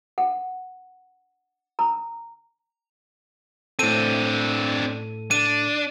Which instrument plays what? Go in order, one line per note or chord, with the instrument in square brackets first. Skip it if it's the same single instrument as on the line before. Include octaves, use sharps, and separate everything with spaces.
[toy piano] F#5
A#5
[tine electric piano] A2 A4 [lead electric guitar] C4 D4 [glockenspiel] D#7
[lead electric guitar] D4 [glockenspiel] D#7